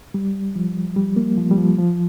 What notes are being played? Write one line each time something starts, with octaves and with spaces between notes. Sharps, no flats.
G3
F3
G3
A#3
F3
G3
F3
F3